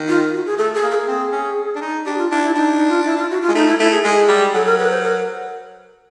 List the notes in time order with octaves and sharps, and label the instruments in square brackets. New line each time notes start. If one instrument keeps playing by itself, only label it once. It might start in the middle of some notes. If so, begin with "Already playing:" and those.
Already playing: [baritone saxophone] D#3
[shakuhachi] F4
F#4
G#4
[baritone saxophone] A3 [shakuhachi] A4
[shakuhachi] G#4
[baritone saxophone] A#3
[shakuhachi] A4
G#4
[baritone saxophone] C4
C#4
D4
D#4
[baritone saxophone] D4 [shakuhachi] G4
[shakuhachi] F4
[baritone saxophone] D4 [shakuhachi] E4
[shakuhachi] E4
[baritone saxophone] D4 [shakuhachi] D#4
[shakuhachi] D#4
F4
E4
F4
F#4
F4
[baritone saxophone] G#3
[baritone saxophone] A3 [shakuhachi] D#4
[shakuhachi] E4
[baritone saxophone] A3 [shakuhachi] E4
[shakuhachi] G#4
[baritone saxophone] G#3 [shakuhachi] G#4
[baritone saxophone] G3
[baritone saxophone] F#3 [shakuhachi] A4
[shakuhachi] A#4
B4
C5
A#4